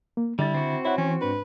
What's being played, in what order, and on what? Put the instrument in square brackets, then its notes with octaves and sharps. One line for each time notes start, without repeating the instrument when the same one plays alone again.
[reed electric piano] A#3
[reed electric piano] D3 A6 [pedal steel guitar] G3 [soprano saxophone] E4
[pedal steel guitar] C4 F#4
[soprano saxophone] E4 [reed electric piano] C#5 F#5
[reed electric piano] E3 [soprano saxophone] C#4
[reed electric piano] G#2 D4 [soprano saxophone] B4